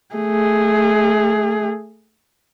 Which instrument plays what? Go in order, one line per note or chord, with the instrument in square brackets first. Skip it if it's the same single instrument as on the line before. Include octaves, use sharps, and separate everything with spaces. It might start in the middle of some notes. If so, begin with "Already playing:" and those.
[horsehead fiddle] A3 G#4